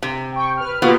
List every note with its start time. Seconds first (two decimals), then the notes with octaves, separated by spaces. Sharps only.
0.03 C3
0.32 G5 C#6
0.57 B4 F6
0.82 B2 A#3 B3 F4 G4